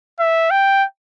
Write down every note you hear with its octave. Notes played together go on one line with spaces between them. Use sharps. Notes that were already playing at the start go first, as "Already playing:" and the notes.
E5
G5